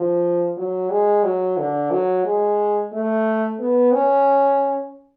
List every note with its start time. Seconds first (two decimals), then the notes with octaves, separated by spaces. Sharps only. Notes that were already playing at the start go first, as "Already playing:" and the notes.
Already playing: F3
0.57 F#3
0.90 G#3
1.24 F#3
1.57 D3
1.91 F#3
2.25 G#3
2.93 A3
3.59 B3
3.93 C#4